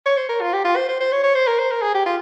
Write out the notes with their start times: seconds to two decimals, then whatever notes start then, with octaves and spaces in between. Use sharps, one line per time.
0.06 C#5
0.17 C5
0.29 A#4
0.41 F4
0.53 G4
0.64 F4
0.76 C5
0.89 C5
1.00 C5
1.12 C#5
1.23 C#5
1.35 C5
1.47 A#4
1.59 C5
1.71 A#4
1.82 G#4
1.94 G4
2.06 F4